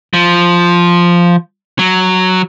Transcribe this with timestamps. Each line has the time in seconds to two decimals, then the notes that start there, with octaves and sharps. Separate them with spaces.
0.14 F3
1.79 F#3